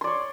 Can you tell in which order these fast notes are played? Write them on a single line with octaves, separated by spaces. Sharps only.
C6 D5 C#5